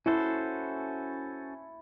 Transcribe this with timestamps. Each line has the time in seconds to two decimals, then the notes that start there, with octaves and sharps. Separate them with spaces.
0.06 C#4 E4 F#4 A4 C5